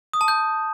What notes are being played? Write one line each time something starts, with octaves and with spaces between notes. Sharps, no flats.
D#6
A5
G6